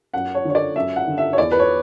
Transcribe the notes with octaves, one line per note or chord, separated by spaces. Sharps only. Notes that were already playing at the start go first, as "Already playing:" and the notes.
F#2 F#5
C#5
D3 C#5
D5
F#2 E5
F#5
D3
E5
C#5
E2 D5
B4
C#5